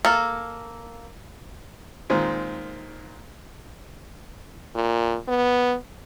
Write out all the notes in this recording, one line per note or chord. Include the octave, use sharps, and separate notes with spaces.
A#3 A4
A#2 D#3 G#3 C4
A#2
B3